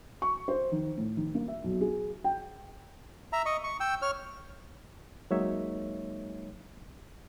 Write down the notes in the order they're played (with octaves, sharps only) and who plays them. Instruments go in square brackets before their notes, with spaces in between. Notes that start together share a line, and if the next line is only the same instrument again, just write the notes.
[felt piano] C#6
C5
D#3
A2
D#3
A#3
E5
B1
G#4
G5
[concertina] E5 A#5
D#5 C#6
C#6
G5 E6
C#5 F6
[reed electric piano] F#3 G#3 A#3 D#4 C#5 E5